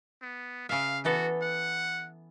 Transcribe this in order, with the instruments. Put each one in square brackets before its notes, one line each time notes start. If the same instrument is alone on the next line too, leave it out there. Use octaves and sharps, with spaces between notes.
[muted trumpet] B3
[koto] C#3 E5 [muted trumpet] F5
[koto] E3 B3 A4 [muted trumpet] F#4
[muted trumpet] F#5